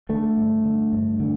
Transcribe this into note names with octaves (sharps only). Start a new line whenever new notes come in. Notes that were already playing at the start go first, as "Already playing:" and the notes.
D3 A3
G2
D3
G2
D3